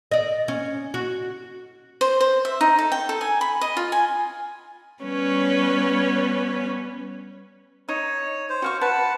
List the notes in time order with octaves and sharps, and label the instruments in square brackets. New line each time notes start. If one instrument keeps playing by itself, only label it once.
[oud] D5 D#5
C#4
F#4
[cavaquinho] C5
C5
E5
D#4
A4
G5
A4
G#5
B5
D#5
F4
G#5
[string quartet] G3 B3 C#4 B4 C#5
[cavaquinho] D#4 [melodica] C#5
[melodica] C5
[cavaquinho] F#4 F5 C#6
[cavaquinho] B4 [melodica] F#5 A5